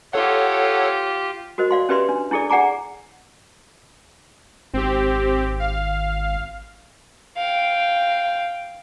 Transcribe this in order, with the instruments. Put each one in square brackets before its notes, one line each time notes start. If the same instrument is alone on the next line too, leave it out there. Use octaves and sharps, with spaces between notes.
[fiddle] F4 G4 [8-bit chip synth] A4 C#5 F#5
[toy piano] F#4 A#4 C5 D#5
D5 F5 C6
C#4 G4 B4 D5 E5 C6
D4
D4 E4 G#4 A4 D5
G#4 D5 F#5 G#5 A#5 D6
[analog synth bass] G#1 [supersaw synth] C4 G4
[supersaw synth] F5
[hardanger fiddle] F5 G5